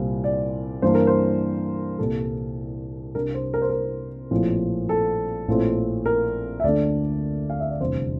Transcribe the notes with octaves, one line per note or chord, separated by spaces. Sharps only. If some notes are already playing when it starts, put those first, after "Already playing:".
Already playing: C2 A#2 G3 C4
D5
G2 E3 A#3 D4 C5
A#4
C5
C2 A#2 G3 A4
C2 C3 G3 D4 A#4
C5
A#4
C5
A#4
A#1 A2 F3 C4
A4
A#1 A2 F3 A3 C4
A#4
E5
D2 D3 A3 D4 D5
F5
E5
D5
F1 E2 C3 G3 D4 C5